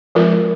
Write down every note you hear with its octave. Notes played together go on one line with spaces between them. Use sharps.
F3 G#3 C4 F4 A#4